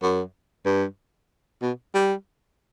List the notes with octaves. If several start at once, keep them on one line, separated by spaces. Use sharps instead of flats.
F#2
G2
B2
G3